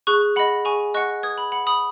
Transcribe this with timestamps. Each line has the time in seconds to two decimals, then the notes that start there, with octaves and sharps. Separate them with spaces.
0.07 G#4 C#6 F#6
0.36 D#5 F#5 B5
0.65 G#4 G#5 C#6
0.94 D#5 F#5 C#6 F#6
1.23 B4 D#6 G#6
1.38 B5
1.52 F#5 B5
1.67 B5 D#6